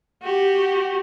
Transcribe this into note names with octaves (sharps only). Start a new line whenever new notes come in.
F#4 G4